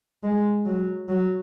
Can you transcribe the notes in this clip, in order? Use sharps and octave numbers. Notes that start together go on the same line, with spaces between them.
G#3
F#3
F#3